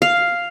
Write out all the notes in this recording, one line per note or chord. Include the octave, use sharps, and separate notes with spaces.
F5